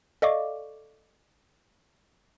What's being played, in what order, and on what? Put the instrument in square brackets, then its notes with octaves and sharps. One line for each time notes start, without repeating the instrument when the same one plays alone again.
[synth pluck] A4 D5 D#5 F5 C#6 D6